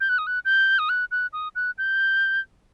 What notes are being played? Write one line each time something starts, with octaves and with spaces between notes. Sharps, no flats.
G6
F#6
D#6
F#6
G6
D#6
F#6
F#6
D#6
F#6
G6